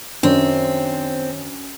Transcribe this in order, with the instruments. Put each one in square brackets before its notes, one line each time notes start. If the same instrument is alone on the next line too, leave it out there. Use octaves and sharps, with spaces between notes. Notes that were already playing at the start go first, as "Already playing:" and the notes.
[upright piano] F#2 [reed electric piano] D#3 C5 C#5 [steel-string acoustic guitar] C4 [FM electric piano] D4